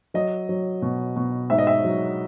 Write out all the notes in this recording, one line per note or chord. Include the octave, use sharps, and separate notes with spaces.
F#3 D#5
F#3
B2
B2
G#2 E5
D#5
E5
F#3